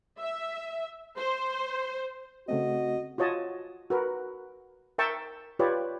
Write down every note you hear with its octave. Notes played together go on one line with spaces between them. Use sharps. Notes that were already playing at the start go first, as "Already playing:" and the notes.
E5
C5
C#3 A3 C4 F#4 D#5
F4 F#4 C#5 D#5 A5
F#4 A#4 B4
A#4 E5 G5 A5 C#6 E6
F4 G4 B4 C#5 D5